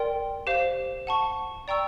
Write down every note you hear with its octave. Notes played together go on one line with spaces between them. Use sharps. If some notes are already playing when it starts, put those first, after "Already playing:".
Already playing: A#4 D5 G5 C6
G4 C5 F5
F#5 A5 C#6
D5 G5 A#5 C#6 E6